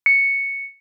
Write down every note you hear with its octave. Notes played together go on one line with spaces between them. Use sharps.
C#7